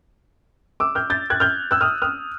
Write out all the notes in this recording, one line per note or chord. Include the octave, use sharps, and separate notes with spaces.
D6 E6
F6 G6
G6 A6
F#6 G#6
F6 G6
E6 F#6
D#6 F6
D#6 F6